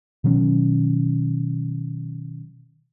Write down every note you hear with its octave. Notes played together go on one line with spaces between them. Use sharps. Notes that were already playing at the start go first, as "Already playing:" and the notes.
B2 D#3 F#3 C#4